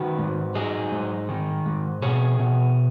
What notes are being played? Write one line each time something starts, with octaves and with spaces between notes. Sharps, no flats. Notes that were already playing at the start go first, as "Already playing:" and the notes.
Already playing: D#3 F#4 B4
G#2
F#3 D#4 G#4
G#2
D#3
G#2
B2 G#4 C#5
B2